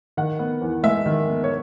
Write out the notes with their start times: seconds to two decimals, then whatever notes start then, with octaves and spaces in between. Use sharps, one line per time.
0.17 D#3 F#5
0.39 B3
0.62 E2
0.83 G#3 E5
1.06 D#3
1.28 B3
1.44 C#5